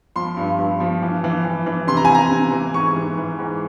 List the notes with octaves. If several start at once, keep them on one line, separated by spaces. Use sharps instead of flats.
F3 C6
G2
G2
F3
E3
E3
E3
E3
C3 C6
A#5
G#5
C3 A#5
C3
E3
G#2 C#6
E3
E3
G#2